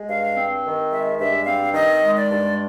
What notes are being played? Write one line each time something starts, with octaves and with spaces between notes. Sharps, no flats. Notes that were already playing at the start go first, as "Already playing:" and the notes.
Already playing: G#3
G2 F5
C4
D#3
G#3 E5
G2 E5
C4 F5
D#3 D#5
G#3
D5
G2